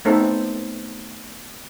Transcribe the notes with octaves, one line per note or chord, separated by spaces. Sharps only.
A3 B3 C4 D#4 A4